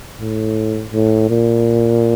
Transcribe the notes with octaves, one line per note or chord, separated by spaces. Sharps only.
A2
A2
A#2